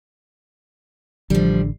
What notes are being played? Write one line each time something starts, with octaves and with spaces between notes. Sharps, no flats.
A1 D3 F3 G3